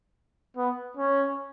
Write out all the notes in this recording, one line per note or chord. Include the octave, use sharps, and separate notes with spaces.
B3
C#4